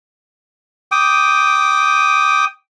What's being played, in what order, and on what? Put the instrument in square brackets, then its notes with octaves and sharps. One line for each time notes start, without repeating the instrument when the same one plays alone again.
[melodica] G5 D6 D#6